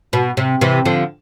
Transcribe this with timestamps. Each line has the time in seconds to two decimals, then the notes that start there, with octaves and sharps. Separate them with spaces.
0.13 B2
0.37 C3
0.61 C3 E3
0.85 D3 F3